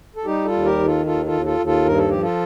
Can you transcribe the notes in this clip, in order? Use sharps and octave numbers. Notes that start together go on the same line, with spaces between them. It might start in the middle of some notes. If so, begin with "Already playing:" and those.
A4
G3 D#4 G4
F4 A4
D#2
G4 A#4
D#3
F4 A4
D#2 F4 A4
F4 A4
D#2
F4 A4
D#2
F4 A4
G2 A#4
A4
F3 G4
F4 A4